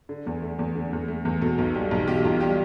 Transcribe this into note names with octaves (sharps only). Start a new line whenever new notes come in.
D3
E2
A3
E2
D3
E2
A3
E2
B2 A4
B1
G3
B1
B2 G4
B1 F4
G3 G4